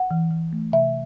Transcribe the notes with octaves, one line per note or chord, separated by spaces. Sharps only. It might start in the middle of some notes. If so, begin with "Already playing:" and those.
Already playing: F#5
E3
E3
A3
C3 E5